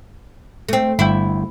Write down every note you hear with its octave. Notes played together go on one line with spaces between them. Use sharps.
A3 C4
G1 E4 G5